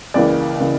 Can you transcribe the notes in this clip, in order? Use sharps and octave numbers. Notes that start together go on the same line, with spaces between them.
C#2 C#3 E3 A#3 D5
C#3 E3 A#3